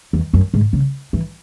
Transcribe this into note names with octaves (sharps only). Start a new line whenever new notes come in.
E2
F#2
G#2
C#3
E3